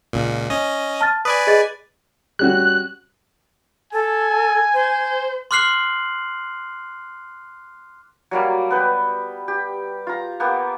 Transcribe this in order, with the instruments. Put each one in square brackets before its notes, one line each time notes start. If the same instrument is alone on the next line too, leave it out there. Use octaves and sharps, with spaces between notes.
[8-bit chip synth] C#2 A#2
C#4 D#5
[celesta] A5 F6 A6
[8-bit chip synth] B4 D5 G#5 [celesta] D#6
[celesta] G#4 D#5 A6
[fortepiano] G3 C#4 F#4 [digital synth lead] F#6
[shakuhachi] A4 [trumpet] G#5
[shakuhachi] C5
[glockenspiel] C6 D6 F6 F#6 C7 F#7
[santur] F#3 G3 A#3
B3 B4 G5
G4
F4 A#5
A#3 B3 G4